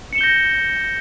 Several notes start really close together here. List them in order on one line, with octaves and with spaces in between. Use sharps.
C#7 E7 G7 G6 A#6